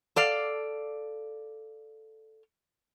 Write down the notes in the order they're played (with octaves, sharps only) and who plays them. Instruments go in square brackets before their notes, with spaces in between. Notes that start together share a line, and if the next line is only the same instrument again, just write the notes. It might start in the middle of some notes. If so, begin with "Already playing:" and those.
[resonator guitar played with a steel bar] A4 D5 F5